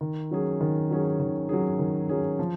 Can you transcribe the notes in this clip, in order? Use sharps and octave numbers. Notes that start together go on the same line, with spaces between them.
D#3
F#3 C#4 G#4
D#3
F#3 C#4 G#4
D#3
F#3 C#4 G#4
D#3
F#3 C#4 G#4
F3